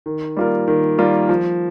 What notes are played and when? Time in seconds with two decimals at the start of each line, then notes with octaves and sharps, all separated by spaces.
0.06 D#3
0.37 G3 A#3 F4 A#4
0.68 D#3
0.98 G3 A#3 F4 A#4
1.29 F3